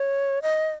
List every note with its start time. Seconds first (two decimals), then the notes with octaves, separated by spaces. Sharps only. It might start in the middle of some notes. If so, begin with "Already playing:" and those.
Already playing: C#5
0.42 D#5